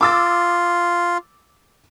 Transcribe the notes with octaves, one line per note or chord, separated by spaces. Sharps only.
F4 D6 E6 A6